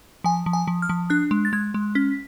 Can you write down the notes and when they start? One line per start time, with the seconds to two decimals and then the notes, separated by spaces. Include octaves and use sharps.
0.24 F3 G#5
0.46 F3
0.53 G#5
0.68 F3
0.82 F6
0.89 F3
1.10 D4 F#6
1.31 G#3
1.45 A6
1.53 G#3 G#6
1.74 G#3
1.95 C#4 B6